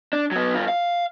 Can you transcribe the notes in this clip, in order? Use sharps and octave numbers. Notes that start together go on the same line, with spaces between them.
D4
F#3 B3
G2 F4
F5